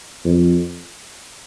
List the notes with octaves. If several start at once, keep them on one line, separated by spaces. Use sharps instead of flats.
F2